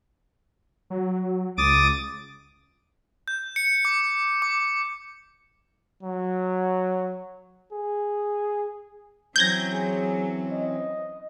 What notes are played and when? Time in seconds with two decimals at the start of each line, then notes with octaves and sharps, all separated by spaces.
0.90 F#3
1.58 C#2 D6 D#6 A6
3.28 G6
3.56 C#7
3.85 D6
4.42 D6
6.03 F#3
7.72 G#4
9.36 E3 F#3 C4 C#4 G6 G#6 A#6
9.73 G#4
10.52 D#5